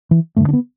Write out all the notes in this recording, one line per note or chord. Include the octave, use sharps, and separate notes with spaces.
E3
G2 D3 A3
D4
B3